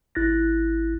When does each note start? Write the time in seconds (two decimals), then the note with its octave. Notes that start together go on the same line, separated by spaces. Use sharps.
0.15 G#1 E4 F#6 A6 A#6